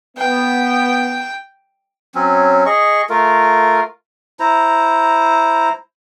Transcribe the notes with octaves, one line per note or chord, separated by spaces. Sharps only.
B3 G5
F#3 C4 C#4
G#4 D#5 C#6
A3 F4 A#4
E4 C5 A#5